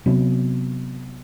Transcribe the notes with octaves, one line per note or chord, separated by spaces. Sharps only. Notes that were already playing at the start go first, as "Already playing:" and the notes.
C3 F#3 B3